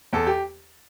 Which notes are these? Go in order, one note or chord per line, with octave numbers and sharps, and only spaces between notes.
E2 A4
G4